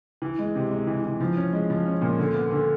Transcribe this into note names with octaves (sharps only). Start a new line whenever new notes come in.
E3
G#3
C3
G#3
E3
E3
F3
C#4
G#3
F3
C#4
A#2
D3
B3
D3